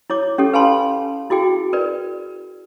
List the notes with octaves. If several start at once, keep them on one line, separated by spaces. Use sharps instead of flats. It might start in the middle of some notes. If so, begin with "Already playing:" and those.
E4 C#5 D6
C#4 G4 A4
B4 F5 G#5 A5 B5 C6
E4 F#4 G#4 G5
A#4 B4 D5